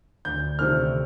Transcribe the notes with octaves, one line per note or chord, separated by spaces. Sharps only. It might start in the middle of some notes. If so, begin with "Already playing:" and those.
D2 G6
C3 D#3 A3 C4 F6